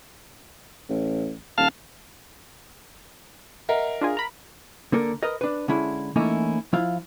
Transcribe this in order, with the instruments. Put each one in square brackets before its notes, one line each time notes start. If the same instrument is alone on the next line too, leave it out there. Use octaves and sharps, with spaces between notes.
[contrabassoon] A1
[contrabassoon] D#1 [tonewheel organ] F5 A5 F6
[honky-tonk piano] A#4 [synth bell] D#5 E5 F#5
[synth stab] D4 F4 G#4
A#5 B5
[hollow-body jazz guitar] D3 A#3 A4 A#4
A#4 B4 D#5
D4 B4
D3 G#3 C#4 E4
E3 A3 A#3 C#4 D#4 E4
F3 E4 F4 F5